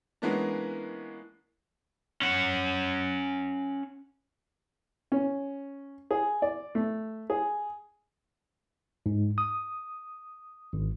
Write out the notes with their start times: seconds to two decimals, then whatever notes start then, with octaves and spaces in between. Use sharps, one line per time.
0.22 E3 G#3 A#3 B3 C#4 D4
2.22 C#4 F#5
5.12 C#4
6.11 G#4
6.42 D5
6.75 A3
7.30 G#4
9.06 G#2
9.38 D#6
10.73 G#1